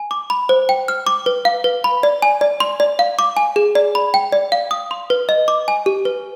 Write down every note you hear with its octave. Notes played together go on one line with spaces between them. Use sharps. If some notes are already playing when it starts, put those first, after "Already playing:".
Already playing: G#5
D6
B5
C5
G5
F6
D6
B4
F5
B4
B5
D5
G#5
D5
C6
D5
F5
D6
G#5
G#4
D5
B5
G5
D5
F5
D#6
C6
B4
D#5
D6
G#5
G4
B4